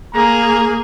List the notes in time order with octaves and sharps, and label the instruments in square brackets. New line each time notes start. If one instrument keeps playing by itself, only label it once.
[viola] A#3 G#4 [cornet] A#5